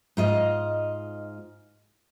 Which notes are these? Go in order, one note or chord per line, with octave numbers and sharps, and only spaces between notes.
G#2 F4 D#5